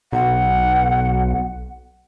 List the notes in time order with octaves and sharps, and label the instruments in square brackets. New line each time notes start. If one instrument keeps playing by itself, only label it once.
[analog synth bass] B1 [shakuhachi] F#5